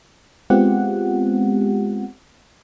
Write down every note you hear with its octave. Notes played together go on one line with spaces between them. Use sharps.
G#3 B3 C4 F4 G4 F#5